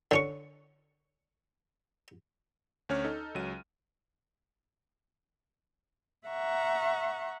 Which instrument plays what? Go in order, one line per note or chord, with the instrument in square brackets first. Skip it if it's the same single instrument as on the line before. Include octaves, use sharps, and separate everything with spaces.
[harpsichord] D3 C#4 C#6
[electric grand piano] D2 C#4 C#5 F6
D#4 A4
C#2 F#3 D#7
[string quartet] E5 F#5 A#5 C#6